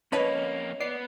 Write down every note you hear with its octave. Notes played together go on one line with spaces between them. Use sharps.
F2 A#3 C#4 B4 C#5 D#5 A5 B5
B3 D5 C7